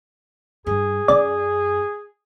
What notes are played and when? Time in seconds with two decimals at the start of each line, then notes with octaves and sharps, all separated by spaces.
0.67 G2 G#4
1.08 F#2 C#4 D5